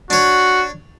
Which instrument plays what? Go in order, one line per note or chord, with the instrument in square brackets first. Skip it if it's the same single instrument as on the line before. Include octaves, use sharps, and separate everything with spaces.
[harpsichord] D4 C#5 [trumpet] F#4